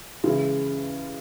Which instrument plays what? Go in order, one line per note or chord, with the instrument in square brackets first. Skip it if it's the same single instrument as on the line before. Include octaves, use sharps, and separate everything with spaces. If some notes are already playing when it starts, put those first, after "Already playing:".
[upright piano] C#3 E3 G#3